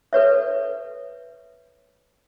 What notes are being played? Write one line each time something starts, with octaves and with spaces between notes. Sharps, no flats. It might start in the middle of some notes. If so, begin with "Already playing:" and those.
A4 B4 C#5 E5